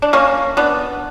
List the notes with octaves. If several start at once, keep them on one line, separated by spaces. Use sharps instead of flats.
D4
A#3 C#4
B3 D4